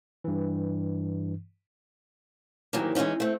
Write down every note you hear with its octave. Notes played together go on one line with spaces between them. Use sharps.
G2 E3
G#2 D#3 E3 F#3 G3 A#3
E3 G#3 A#3 C#4 D#4
A3 C4